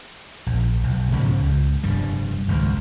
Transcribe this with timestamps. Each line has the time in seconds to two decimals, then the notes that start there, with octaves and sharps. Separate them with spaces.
0.47 A#1
0.84 B1
1.12 G#2 C#3 F3 C#4
1.40 C#2
1.83 F1 G2 G3
2.48 G#1 C#2 F#2